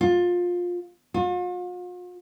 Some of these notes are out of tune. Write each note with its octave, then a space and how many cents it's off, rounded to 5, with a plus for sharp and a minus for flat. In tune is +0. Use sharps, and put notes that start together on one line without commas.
F4 +20
F4 +45